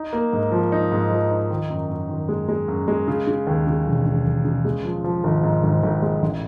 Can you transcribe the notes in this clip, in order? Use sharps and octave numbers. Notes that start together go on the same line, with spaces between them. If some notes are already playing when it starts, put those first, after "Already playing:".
Already playing: D#4
A#3
G#2
F3
D#4
G#2
F3
D#4
D#3
F#2
F#2
D#3
G#3
G#3
F#2
G#3
C#3
C#3
D#2
C#3
E1
C#3
E1
C#3
G#3
F3
F3
G#1
G#2
G#1
G#1
G#3
A1